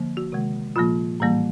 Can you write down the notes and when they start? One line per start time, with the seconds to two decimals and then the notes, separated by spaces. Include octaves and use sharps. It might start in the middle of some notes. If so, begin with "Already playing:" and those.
Already playing: D3 F3 A#3
0.17 F#4
0.32 C3 D#3 G#3
0.76 A#2 F3 A#3 F4
1.20 A2 E3 G3 A#3